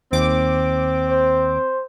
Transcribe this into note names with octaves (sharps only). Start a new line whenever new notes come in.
D#2 C4 D6
C5